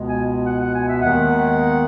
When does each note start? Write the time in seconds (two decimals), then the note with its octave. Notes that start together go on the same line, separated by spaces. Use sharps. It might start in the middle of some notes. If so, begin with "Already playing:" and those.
Already playing: C#2 B2 G#3 B3
0.09 G#5
0.47 F#5
0.61 F#5
0.75 G#5
0.89 E5
1.02 D#2 D#3 G#3 B3 F#5